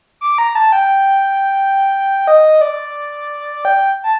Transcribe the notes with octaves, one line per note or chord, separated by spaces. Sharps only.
D6
A#5
A5
G5
D#5
D5
G5
A5